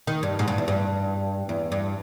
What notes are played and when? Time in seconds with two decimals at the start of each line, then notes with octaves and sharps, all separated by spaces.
0.07 D#3
0.23 G2
0.39 G#2
0.48 G2
0.58 E2
0.68 G2
1.49 E2
1.72 G2